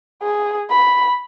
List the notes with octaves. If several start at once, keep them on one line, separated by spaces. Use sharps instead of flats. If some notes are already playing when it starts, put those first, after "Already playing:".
G#4
B5